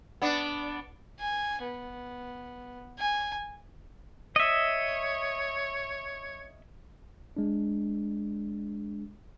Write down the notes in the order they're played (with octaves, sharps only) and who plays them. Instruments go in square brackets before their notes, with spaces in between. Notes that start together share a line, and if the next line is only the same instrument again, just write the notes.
[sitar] B3 D4
[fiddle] G#5
B3
G#5
[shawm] C#5 [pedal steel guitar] D#5 E5
[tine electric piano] G#3 D4